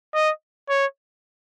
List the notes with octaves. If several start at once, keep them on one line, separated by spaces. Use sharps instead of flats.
D#5
C#5